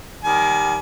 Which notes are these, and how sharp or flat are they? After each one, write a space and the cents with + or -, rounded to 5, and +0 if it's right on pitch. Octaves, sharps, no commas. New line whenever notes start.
D#3 +0 G3 +0 G#5 +35